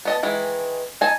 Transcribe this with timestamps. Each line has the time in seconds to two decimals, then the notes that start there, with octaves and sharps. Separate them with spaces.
0.05 B3 D#5 A5
0.23 D#3 E3 G#3
1.01 D#4 G#5 A5